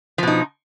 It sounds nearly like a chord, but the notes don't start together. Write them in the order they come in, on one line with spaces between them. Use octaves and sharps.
F3 B2 D#4